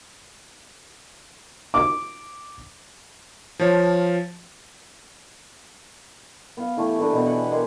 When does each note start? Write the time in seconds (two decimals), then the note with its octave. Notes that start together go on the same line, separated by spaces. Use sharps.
1.74 D6
3.59 F3 C#5 A5
6.57 B3 F5
6.77 E3 A3 G4 C#6
6.99 E3 A3 D4 B4
7.12 B2 B3
7.26 B4 F#5 G#5
7.51 G#3 G4 G#4 A#4